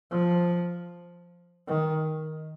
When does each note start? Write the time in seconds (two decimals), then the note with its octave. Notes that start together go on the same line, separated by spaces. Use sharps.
0.11 F3
1.67 D#3